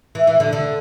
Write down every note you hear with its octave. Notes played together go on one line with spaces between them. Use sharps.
E3
E3
D3
D3